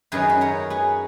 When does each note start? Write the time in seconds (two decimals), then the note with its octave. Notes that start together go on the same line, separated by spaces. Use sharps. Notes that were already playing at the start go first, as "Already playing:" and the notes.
0.12 F#2 D#3 F#3 G#4 B4
0.30 B4
0.41 A#4 C#5
0.70 G#4 B4